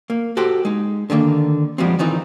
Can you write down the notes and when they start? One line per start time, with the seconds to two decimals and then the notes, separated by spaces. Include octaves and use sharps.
0.10 A#3
0.37 F#4 G4 A4 C5
0.65 G#3 D#4
1.10 D3 D#3 G#3 A#3
1.78 F3 G3 G#3 B3 C4
1.99 D#3 E3 C4 D#4 F4